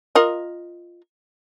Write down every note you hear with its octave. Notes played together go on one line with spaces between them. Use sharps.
F4 A#4 D#5